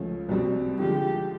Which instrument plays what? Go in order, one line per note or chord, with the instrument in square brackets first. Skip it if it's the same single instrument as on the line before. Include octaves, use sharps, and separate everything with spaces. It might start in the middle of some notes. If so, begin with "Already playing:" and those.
Already playing: [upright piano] C#2 C#3 F3 A3 C#4
C2 B2 G3 C4
[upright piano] D3 F3 G#3 [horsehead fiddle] G4